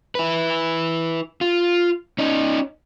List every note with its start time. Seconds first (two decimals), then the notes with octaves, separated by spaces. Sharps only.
0.15 E4 B4
1.41 F4
2.19 C#4 D#4